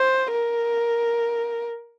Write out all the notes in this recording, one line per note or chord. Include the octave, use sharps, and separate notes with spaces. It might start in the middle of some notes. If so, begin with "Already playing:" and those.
Already playing: C5
A#4